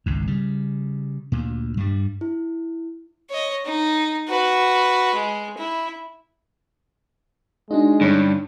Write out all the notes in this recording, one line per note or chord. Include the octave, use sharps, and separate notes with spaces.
G#1 C#2 G#2
C#3 G3
D2 A#2
G2 G3
E4
C#5 D#5
D#4
F#4 B4
G#3
E4
G#3 D4 D#4 F#4 D#5
G2 D3 C#4